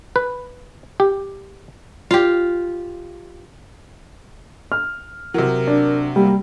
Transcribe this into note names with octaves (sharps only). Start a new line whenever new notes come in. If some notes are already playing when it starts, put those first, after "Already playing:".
B4
G4
F4 G4
F6
C3 F#3 A#4
D4
G3 A#3